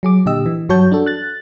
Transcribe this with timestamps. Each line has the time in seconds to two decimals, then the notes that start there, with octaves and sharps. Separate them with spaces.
0.03 F#3 G#4 D6
0.26 A#2 D3 G4 D#5 E6
0.46 E3
0.69 G2 F#3 F#4 C#5 A5 G6
0.92 D4 F#4 A4
1.06 F#6 A6